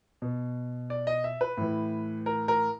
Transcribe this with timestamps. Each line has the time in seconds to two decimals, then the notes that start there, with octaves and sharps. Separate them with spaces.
0.22 B2
0.90 D5
1.07 D#5
1.24 E5
1.41 B4
1.57 A2 E3
2.26 A#4
2.48 A#4